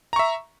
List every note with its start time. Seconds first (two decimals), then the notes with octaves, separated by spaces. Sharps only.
0.13 A#5
0.16 C#6
0.19 E5